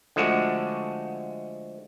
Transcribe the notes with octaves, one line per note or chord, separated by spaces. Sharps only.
D3 F3 G#3 A3 F#4